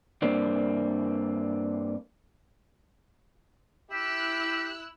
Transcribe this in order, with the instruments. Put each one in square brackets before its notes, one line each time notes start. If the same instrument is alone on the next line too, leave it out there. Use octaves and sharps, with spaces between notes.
[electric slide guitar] G2 A#3 C4 D4
[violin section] E4 E6 F#6 [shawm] G4